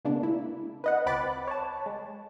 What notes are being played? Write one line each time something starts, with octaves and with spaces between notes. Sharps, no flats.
C#3 G#3 A#3 B3 D4
E4
B4 D#5 F#5
C#2 C4 B5 D6 F#6 A6
C#5 A5
G#3